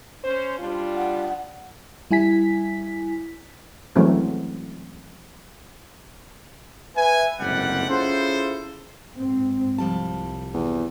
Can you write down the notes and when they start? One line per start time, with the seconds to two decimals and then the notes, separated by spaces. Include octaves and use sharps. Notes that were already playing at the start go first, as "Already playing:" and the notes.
0.23 C#4 C5
0.59 G3 D4 F4
0.96 F#5
2.11 G3 E4 G#5 B6
3.96 E3 F#3 G#3 A3 C4 C#4
6.96 B4 E5 G#5
7.40 F#1 F2 G#2 C3 G3 F#5
7.89 C#4 E4 F4 G#4 A4 C5
9.18 G#2 C4
9.78 C2 F3 G3 A5
10.54 E2